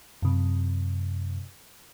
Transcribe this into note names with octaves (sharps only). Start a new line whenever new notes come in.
F#2 C3